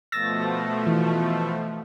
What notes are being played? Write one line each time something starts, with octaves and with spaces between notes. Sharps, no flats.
B2 F3 A3 E6 A6 A#6
E3